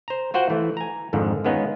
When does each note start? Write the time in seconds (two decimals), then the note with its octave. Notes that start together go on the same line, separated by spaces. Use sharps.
0.08 C5 A#5
0.34 F4 F#4 C5 F#5 G5
0.50 E3 A3
0.77 G#5 A#5
1.13 F2 G#2 D3 D#3 F3
1.45 D#3 G#3 B3 C#4 D#4 F4